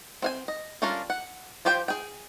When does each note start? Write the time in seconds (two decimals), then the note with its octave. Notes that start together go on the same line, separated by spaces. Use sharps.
0.22 C4 F5 G#5
0.48 D#5
0.82 G3 C#4 D4 F4 A#4
1.10 F#5
1.65 F3 F4 G4 C5 G5
1.88 G#4 G5